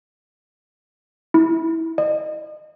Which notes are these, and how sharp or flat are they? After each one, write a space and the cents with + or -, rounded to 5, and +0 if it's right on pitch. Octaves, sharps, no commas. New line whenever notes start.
E4 -15
D#5 -35